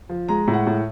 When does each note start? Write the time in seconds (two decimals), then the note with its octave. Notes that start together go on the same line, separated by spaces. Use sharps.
0.09 F3
0.28 G#3 A#5
0.48 A2
0.53 F#5
0.67 A2